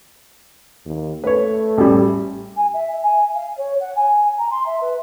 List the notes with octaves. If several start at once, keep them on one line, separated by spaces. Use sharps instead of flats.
D#2
A3 B4 C#5
A1 G3
G#5
E5
G#5
F5
C#5
F#5
G#5
A#5
C6
E5
B4